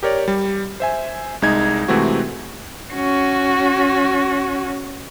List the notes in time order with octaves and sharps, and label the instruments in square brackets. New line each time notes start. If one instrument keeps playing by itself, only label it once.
[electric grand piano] G4 A#4 C#5 D5
G3
C5 E5 G#5
C2 G#3 D#4 G#6
C3 E3 G#3 A3 C4 F#4
[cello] C#4 F#4